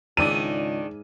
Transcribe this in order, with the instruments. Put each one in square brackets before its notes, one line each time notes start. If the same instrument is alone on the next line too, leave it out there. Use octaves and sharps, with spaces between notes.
[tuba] C#2 [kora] G#2 D5 E5 [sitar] D#3 D4 [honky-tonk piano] D#7